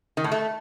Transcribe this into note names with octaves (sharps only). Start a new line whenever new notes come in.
D#3
A2
A3